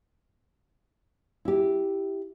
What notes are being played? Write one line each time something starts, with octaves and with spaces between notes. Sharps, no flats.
E4 G4